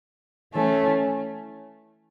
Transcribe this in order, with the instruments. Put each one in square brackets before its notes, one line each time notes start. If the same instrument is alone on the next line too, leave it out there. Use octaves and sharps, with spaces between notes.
[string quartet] E3 A3 C#4